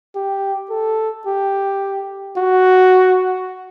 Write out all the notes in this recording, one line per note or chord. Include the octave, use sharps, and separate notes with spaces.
G4
A4
G4
F#4